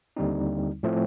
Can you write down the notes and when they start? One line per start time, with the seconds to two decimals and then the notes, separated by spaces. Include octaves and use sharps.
0.17 D#2 D3 G3 C4 D#4
0.83 A2 F3 A3 C4